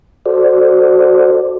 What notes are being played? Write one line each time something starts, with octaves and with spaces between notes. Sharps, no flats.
F#4 A4 C5 D5